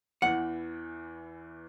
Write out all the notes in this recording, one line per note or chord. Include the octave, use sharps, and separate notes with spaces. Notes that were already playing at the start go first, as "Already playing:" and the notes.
E2 E3 F#5